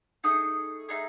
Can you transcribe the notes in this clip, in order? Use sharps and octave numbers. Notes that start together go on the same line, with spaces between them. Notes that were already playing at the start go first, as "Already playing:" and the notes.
A3 D#4 G#4 D#6
A3 D#4 G#4